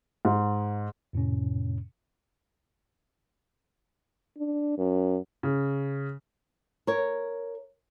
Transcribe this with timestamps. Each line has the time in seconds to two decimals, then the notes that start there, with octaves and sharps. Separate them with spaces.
0.25 G#2
1.13 F2 A2 C3 C#4
4.37 D4
4.78 F#2
5.43 C#3
6.87 A#4 C#5